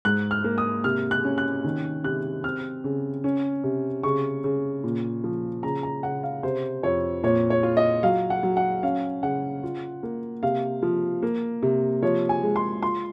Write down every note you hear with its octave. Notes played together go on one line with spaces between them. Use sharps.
G#2 F#6
F6
A#3
D#6
C3 F6
F#6
C#4
F#6
D#3
C3 F#6
C4 F6
C#3
C#4
C3
C#3 C#6
C#3
A#2
F3
C#3 A#5
A#5
C#3 F#5
F5
C3 C5
F2 C#5
A#2 C#5
C#5
F4
D#5
F#3 F5
F#5
F#3
F#5
C#4 F5
C#3 F#5
F4
A#3
C3 F5
F3
A#3
C3
F3 C#5
G#5
G#3
C6
F4 C6